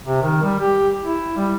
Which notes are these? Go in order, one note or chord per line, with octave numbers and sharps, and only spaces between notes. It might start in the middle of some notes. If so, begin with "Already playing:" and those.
C3
D#3
G3
G4
E4
G3